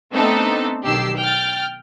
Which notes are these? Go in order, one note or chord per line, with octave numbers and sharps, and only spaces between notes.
A3 B3 C4 D4 D#4 A4
B1 D#3 G4 E6 C7
G5 F6 A6